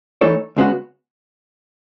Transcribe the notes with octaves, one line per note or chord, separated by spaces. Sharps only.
E3 A3 D#4 A4 C#5
C#2 C#3 G#3 B3 F#4